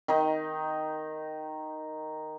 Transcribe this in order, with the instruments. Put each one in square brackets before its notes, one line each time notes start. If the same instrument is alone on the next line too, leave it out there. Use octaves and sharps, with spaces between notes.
[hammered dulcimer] D#3 D#4